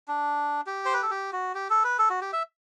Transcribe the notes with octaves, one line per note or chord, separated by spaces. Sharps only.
D4
G4
C5
B4
A4
G4
F#4
G4
A4
B4
A4
F#4
G4
E5